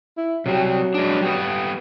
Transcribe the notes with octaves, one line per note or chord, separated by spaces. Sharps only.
E4
C3 F#3 G3
G#3 D4
G3 B3